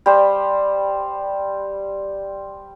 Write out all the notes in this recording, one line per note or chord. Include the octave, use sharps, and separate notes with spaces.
G3 C5